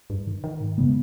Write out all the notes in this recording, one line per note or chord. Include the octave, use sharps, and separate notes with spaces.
G2
D#3
D#3
G#2
G2 C#3 G#3 B3